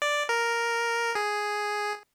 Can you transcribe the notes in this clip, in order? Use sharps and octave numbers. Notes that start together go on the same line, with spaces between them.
D5
A#4
G#4